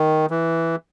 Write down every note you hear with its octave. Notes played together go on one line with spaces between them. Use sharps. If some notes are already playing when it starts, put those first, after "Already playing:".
Already playing: D#3
E3